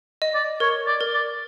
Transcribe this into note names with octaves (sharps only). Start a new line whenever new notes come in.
D#5
D5
A#4 C#5
D5
A#4
D5